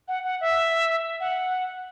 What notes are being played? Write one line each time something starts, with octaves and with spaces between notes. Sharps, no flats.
F#5
F#5
E5
F#5